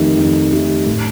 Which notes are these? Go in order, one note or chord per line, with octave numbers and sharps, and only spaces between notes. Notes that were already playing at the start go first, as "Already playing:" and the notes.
Already playing: F2 D#3 A3 D#4 G4
F2
D#3 A3 D#4 G4
A2